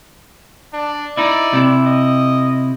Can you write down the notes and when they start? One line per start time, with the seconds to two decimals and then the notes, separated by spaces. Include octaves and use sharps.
0.74 D4
1.17 D#4 E4 D5
1.53 C3 E4
1.86 D#5